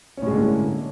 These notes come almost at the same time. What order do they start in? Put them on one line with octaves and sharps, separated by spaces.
C#4 A2 G#3 D3 A#3